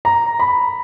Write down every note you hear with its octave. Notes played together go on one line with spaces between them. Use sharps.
A#5
B5